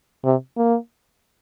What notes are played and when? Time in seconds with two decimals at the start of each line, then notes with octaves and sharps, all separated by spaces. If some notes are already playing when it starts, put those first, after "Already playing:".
0.24 C3
0.57 A#3